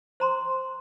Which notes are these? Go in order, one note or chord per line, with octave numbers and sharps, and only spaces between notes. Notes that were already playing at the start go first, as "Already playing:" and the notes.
C5 A#5 C6